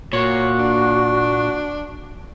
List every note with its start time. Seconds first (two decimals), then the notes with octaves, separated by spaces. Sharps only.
0.13 A#2 F#4 C#5
0.59 D4